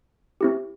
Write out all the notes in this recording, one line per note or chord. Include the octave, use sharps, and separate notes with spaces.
C4 E4 G4